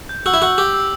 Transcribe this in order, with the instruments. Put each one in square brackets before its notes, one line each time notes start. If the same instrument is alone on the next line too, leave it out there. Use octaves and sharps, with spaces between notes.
[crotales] G6
[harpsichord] F#4 [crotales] E6
[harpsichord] E4
[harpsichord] F#4 [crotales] E6
[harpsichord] G4 [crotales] E6
[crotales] E6